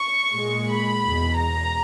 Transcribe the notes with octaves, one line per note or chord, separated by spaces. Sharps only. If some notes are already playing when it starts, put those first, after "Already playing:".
Already playing: C#6
A#2 G#3
B5
E2 B2 G#3
A#5